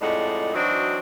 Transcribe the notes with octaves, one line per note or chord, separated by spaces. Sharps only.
F2 A2 G#3 D#4 D5 F#5
E3 F#3 C4 D4 D#4 F#4